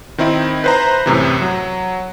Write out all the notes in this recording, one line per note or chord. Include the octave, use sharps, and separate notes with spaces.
D#3 C4 D#4 E4
B4 C5 A#5
F#2 A2 C3 E3
F#3